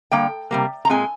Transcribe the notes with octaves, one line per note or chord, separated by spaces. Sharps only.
D3 G3 A#3 G5
C3 G3 A#3
A#5
A#2 G#3 C4 G#5